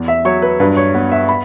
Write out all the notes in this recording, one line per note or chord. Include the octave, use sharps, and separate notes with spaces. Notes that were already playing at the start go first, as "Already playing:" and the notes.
Already playing: E2
E5
F#3 C#5
B4
G2 B4
C#5
B3
E5
B5